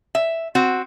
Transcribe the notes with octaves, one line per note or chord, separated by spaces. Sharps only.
E5
C4 F#4